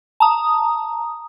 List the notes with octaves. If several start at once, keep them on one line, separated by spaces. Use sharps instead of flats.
A5 A#5 D#6